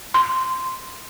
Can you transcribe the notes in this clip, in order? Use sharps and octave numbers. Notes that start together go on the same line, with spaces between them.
C6